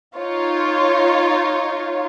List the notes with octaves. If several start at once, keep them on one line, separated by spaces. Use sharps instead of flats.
D#4 F4 C#5